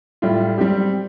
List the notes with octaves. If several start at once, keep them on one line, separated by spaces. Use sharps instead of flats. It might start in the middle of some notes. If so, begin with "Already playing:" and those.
A2 G3 F4
G3 C4 G4